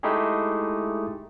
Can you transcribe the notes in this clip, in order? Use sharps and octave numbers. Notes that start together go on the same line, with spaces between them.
G#3 A3 D#4 E4 G4 G#4